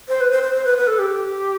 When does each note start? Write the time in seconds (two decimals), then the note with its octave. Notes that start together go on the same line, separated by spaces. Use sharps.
0.08 C5
0.21 B4
0.32 C5
0.43 C5
0.55 C5
0.65 B4
0.78 B4
0.87 A4
0.99 G4